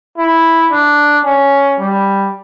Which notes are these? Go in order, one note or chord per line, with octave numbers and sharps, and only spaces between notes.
E4
D4
C#4
G3